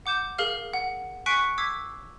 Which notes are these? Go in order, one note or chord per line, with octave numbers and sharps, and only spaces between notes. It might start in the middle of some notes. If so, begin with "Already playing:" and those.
F#5 D6 G6 E7
G#4 A#4 F5 F6
F#5
G#5 C#6 F#6 B6 C#7 D7
D6 E6 G#6 B6 C7